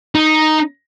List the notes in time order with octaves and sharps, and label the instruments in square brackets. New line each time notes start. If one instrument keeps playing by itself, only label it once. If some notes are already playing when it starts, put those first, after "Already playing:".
[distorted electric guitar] D#4